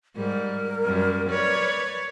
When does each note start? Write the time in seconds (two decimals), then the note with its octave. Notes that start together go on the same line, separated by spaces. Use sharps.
0.16 G#2 G3 A#4
0.85 F#2 G3
1.29 B4 C#5 D5